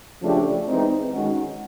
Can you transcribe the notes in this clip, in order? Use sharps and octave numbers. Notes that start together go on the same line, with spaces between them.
C#3 F3 A3 D4 G4
E3 G#3 C4 D#4
D#3 G#3 C#4 F#4